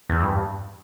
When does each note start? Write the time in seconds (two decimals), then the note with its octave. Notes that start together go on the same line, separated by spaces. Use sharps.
0.10 E2
0.23 G2